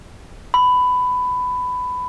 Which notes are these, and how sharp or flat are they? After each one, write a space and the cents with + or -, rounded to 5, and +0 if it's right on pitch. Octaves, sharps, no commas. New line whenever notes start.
B5 +15